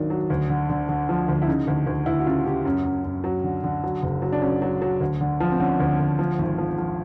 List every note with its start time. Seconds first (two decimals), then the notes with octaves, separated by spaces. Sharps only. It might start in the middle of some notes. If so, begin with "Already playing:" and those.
Already playing: G#1 D#3 F#3 D4 D#4
0.10 F#3
0.30 D2
0.49 D3
0.70 D3
0.89 D3
1.09 F3
1.28 D2
1.42 E4
1.47 C#3 D#4
1.67 D2
1.87 D2
2.06 D2 E4
2.20 F#4
2.26 C#3 F4
2.46 C#3 G4
2.65 F#2 C#4
2.85 F#2
3.04 F#2
3.24 F#3
3.44 D3
3.64 D3
3.84 F#3
4.02 F#1
4.22 F#3
4.32 D4
4.42 F#3 C#4
4.62 F#3
4.82 F#3
5.00 D2
5.21 D3
5.40 F3
5.51 C4
5.60 D3 C#4
5.80 D2
5.99 D2
6.19 F3
6.39 G#1
6.58 F3
6.78 F3